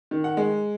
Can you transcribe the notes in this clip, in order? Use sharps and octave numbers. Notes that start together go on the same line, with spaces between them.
D#3
F#5
G#3